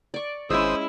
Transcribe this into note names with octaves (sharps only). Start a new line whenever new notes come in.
D5 C#6
G#1 G#3 C#4 E4 C5 D#6 E6